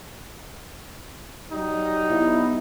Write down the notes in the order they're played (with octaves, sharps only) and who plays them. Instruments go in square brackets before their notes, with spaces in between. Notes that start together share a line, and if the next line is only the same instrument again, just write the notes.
[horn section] F#3 G3 D#4
[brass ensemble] B3 E4